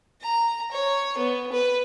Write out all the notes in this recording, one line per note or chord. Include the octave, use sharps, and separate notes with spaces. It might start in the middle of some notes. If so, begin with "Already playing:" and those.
A#5
C#5
B3
B4